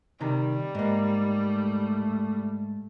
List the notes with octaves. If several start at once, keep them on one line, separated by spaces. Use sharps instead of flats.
C3 D#3 G3
G#2 A#3
A3